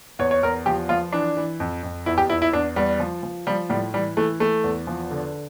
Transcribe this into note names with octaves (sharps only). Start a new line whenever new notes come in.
E2 C#5
C#5
E2 A#4
F3 G4
F3 F4
E3 D4
E3
F2
F2
E2 E4
G4
E2 E4
E4
E2 D4
E2 G3
F3
F3
F3 G3
A2 G3
E3 G3
E3 A3
E3 A3
E2
F3
D3